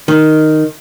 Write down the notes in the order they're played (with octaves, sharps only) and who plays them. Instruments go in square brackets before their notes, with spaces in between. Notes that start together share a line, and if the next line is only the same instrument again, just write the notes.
[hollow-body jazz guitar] D#3